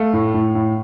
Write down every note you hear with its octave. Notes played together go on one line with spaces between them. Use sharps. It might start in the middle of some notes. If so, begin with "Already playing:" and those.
Already playing: A3 F5
A2
A2
A2